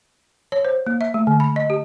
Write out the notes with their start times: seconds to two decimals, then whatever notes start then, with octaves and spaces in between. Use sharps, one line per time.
0.52 C#5
0.65 C5
0.86 A#3
1.01 E5
1.14 A3
1.27 D3
1.40 B5
1.56 D#5
1.70 G4